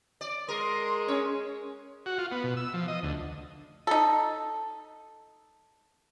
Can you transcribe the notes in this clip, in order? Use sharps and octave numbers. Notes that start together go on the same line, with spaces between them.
D5
G#3 A#4 C6 D#6
C#4 C#5
F#4
F4
B3
B2
E6
F3
D#5
D2
D#4 A4